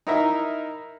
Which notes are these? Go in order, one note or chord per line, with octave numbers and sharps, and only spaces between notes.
D#4 E4 A#4 E5 A#5